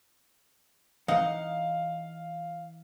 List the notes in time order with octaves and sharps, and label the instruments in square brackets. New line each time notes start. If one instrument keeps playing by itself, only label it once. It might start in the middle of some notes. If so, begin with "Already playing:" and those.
[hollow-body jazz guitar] E3 F#5 [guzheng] D#4 [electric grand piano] F5